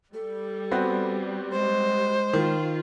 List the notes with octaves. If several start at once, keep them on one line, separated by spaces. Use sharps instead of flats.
G3 A4
B3 C4 F#4
G#3 C5
D#3 F4